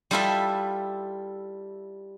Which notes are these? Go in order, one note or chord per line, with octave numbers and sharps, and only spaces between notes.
G3 E4 F4 A4 D#5 E5